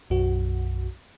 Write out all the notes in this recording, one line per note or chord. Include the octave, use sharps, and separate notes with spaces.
B1 F#2 F#4